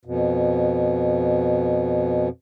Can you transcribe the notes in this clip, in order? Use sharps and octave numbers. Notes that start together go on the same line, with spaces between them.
F2 B2